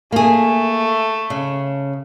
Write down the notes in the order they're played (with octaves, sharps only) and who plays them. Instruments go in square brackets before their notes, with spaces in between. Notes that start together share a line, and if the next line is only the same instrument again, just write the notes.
[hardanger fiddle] A3 [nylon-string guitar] A#3 G#4
[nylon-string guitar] C#3